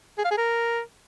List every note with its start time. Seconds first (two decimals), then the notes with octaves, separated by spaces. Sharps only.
0.18 G#4
0.24 F5
0.31 G#4
0.38 A#4